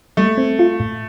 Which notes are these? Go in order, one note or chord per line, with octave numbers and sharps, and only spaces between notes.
G3 A3
C4
F4
A2